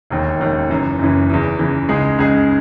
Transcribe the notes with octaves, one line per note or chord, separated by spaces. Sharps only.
E1 D#2 D#3
E1 D#2 D#3
F#1 F#2 E3
F#1 F#2 E3
E2 C#3 E3
E2 C#3 E3
C#2 C#3 G#3 D#4 G#4
C#2 C#3 G#3 D#4 G#4